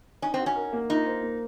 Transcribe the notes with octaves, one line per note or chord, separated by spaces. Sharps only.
C#4 D#4
C4
F#4
C#4
A#4
A#3
D#4 F4
C5
A#3